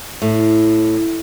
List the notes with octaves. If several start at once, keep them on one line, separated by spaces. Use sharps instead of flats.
A2